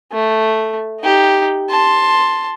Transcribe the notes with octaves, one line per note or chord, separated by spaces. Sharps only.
A3
D#4 G4
A5 C6